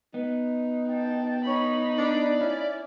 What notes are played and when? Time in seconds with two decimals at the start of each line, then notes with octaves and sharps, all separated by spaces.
0.14 B3 D#4
0.89 G5 A5
1.47 D#4 C#5 B5
1.98 D4 D5
2.41 C#4 E4